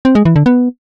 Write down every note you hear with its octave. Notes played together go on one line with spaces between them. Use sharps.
C4
G#3
E3
D3
B3